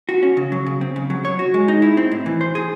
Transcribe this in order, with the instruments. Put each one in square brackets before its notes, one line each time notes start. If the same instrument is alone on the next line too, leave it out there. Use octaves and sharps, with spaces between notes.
[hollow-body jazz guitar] F#4
C#4
C#3
F#3
C#3
C4
C#3
F#3
C#5
F#4
G#3
D#4
E4
C4
A2
E3
C5
G#4